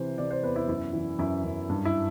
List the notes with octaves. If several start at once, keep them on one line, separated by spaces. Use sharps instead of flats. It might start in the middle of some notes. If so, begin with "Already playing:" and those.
Already playing: C3 E3 C5
C3 D5
C5
E2 B4
E4
F#2 E4
E3
F#2 E4
F#2
G2
E4